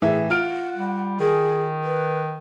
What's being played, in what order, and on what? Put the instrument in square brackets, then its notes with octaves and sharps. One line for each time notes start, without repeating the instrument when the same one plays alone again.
[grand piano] A2 E3 E5 [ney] G#4
[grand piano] F4 F6 D7 [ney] F#5
[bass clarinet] G3
[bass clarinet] D#3 [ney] G#4
[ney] B4